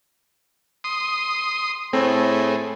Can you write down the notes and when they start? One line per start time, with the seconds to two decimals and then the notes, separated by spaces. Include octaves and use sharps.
0.84 C6 D#6
1.93 A2 A3 C4 G#4